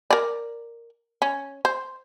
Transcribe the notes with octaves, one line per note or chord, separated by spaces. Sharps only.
A#4 D5
C#4
C5